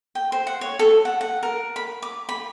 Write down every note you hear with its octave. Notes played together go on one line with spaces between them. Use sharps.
G5
C5
F#5
C#5
A4
F#5
F#5
A#4
B5
D6
B5